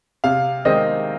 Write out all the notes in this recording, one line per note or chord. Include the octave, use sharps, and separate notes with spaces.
C3 F5
D#3 G#3 C4 D#5